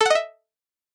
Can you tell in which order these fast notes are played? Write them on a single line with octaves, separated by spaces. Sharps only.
A4 F#5 D#5 E5